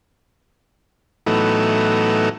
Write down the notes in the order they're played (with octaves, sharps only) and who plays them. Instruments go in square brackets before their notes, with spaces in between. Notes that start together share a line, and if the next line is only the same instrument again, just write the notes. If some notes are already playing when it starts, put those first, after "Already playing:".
[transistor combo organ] A2 E3 F#3 A3 B3 D#4